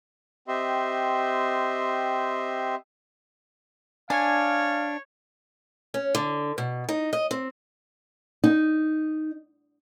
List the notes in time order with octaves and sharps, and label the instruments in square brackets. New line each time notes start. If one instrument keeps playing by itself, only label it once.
[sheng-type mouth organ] C4 G4 D#5 E5 C6
[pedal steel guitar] D4 [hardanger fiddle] C#5 [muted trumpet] F5 [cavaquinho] G#5
[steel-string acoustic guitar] C#4
D3
B2
D#4
D#5
C4
[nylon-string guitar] D#4